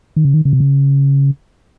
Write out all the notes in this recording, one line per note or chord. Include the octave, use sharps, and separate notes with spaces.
D#3
C#3
D#3
C#3
C3
C#3